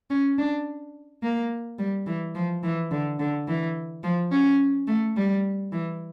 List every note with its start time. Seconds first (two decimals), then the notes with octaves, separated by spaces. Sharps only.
0.10 C#4
0.38 D4
1.22 A#3
1.79 G3
2.07 E3
2.35 F3
2.63 E3
2.91 D3
3.19 D3
3.47 E3
4.03 F3
4.32 C#4
4.88 A3
5.16 G3
5.72 E3